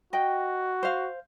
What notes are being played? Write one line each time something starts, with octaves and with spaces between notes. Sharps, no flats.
F#4 D#5 G5
C5 F5